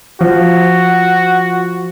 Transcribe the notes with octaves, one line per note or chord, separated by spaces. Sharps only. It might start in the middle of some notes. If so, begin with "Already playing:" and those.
F3 F#4